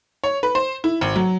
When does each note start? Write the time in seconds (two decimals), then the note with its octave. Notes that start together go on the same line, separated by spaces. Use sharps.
0.24 C#5
0.43 B4
0.55 C5
0.84 E4
1.01 G#1
1.16 F#3